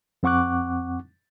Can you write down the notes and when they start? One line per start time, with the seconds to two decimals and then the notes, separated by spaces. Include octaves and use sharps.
0.23 F2 C4 F#5 C#6 D6 F#6